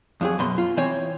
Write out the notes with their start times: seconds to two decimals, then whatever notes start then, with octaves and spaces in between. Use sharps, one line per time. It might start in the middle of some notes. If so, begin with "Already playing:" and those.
0.21 F2 F#3 G#4
0.39 F#2 B2 C6
0.58 F4
0.77 E3 C4 C#5